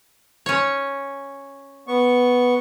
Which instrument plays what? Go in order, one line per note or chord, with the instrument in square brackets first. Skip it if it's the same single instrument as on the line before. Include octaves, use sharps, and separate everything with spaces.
[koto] C#4 C#5
[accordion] B3 C#6